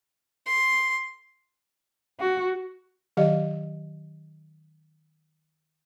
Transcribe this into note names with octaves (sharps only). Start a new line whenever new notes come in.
C6
F#4
D#3 F#3 G4 D#5 F5